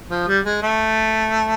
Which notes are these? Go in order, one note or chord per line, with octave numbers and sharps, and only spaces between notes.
F3
G3
G#3
A3